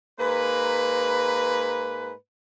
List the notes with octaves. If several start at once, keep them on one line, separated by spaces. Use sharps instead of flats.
G#2 A#3 B4